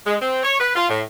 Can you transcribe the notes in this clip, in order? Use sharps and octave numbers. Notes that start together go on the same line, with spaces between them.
G#3
C4
C#5
B4
F4
A2